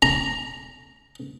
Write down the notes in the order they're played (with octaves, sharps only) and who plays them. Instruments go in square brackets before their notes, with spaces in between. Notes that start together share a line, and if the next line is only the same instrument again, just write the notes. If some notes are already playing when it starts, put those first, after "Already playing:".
[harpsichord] A#5